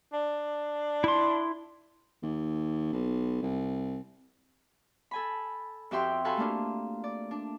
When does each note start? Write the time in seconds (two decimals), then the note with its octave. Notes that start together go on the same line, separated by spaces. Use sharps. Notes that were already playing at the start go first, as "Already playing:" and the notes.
0.13 D4
1.04 E4 C6
2.22 D#2
2.93 B1
3.42 C2
5.11 A4 G#5 B5
5.91 F2 F#4 G4 E5 G5 C6
6.25 F#4 A4 B4 F5 G#5 C6
6.37 A3 A#3 D4 F4
7.04 D5
7.31 D4